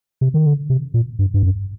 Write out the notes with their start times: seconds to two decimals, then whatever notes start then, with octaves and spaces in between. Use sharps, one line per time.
0.21 C3
0.34 D#3
0.46 D3
0.70 C3
0.94 A#2
1.19 G2
1.34 G2
1.43 F#2